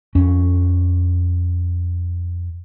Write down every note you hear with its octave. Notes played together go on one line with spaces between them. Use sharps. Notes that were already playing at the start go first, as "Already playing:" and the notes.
F2 C#4